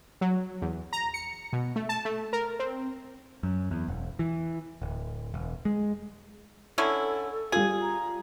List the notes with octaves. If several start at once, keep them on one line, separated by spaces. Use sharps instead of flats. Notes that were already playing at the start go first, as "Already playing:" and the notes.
F#3
E2
A#5
C#7
B2
A3
A5
A3
A#4
C4
F#2
E2
E1
E3
D1
E1
G#3
D3 C#4 E4 A4
G3 F4 G#4
A#5